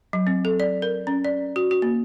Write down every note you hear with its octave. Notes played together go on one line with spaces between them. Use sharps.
F#3
C4
A4
D5
A#4
C#4
D5
F#4
F#4
A#3